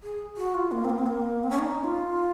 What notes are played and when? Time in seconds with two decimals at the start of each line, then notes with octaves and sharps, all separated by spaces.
0.03 G#4
0.37 F#4
0.54 F4
0.72 A#3
0.85 C4
0.90 A#3
0.98 C4
1.06 A#3
1.43 C4
1.51 C#4
1.59 D#4
1.83 F4